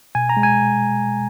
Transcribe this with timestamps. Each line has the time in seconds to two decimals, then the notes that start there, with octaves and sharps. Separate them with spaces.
0.15 B2 G#5
0.29 A#5
0.37 G#3
0.43 G#5